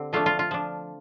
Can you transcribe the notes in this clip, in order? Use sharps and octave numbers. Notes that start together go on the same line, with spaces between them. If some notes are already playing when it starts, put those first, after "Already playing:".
Already playing: D3 C4 G4
F3 A3 D4 F4
F4
F4
F3 D4